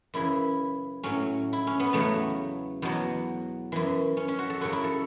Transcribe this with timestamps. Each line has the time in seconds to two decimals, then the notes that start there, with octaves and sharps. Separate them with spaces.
0.14 F#2 C#3 E3 E4
1.03 A2 F#3 C#4
1.53 E4
1.67 C#4
1.80 B3
1.93 E2 C#3 F#3 A3
2.82 E2 B2 F#3
3.72 F#2 E3
4.17 C#4
4.28 C#4
4.39 F#4
4.50 A4
4.61 F#2 C#3 F#3 F#4
4.72 E4
4.84 A4